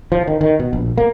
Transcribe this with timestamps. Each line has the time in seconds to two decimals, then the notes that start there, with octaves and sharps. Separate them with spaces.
0.12 F3
0.28 D#3
0.41 D#3
0.59 B2
0.73 A#1
0.98 A#3